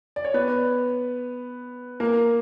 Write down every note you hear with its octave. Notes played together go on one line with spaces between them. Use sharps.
D5
C#5
B3 B4
A#3 A#4